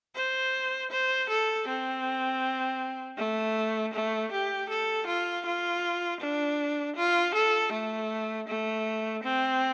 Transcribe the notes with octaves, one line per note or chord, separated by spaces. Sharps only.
C5
C5
A4
C4
A3
A3
G4
A4
F4
F4
D4
F4
A4
A3
A3
C4